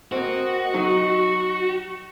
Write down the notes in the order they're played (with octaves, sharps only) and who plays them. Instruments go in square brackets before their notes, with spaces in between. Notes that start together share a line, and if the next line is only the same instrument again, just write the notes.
[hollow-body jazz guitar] A#3 C4 [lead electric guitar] F#4 [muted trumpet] D#5
[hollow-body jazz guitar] F#3 D#4 [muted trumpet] C#6